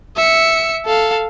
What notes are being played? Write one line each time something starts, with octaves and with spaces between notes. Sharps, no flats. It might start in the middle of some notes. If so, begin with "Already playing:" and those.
E5 C#7
A4 F5